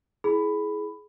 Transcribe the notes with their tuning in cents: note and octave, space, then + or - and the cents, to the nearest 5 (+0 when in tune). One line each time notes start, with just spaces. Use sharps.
E4 +0 G#4 +25 B5 +10